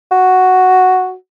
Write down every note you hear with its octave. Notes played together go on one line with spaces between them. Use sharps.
F#4